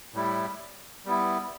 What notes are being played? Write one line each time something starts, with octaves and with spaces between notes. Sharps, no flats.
A2 G3 E4
G3 B3 E4